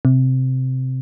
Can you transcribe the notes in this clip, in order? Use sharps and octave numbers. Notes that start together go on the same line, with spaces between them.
C3